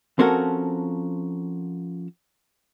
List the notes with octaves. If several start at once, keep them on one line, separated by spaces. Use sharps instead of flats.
F3 C4 C#4 F#4 A4 A#4